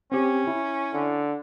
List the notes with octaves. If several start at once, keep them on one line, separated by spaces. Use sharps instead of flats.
C4 C#4 G4
E4
D3